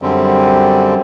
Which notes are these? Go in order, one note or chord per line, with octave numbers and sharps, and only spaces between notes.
F#2 D3 G3 C4